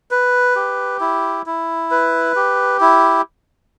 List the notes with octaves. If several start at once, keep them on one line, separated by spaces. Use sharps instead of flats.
B4
G4
E4
E4
B4
G4
E4